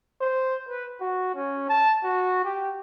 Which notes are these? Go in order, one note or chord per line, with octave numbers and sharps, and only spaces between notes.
C5
B4
F#4
C#4
A5
F#4
G4